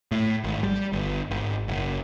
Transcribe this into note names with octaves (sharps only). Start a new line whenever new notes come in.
A2
G#1
G3
G1
G#1
F#1